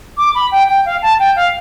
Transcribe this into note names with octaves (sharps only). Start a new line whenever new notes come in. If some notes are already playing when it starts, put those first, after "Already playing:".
D6
B5
G5
G5
F5
A5
G5
F5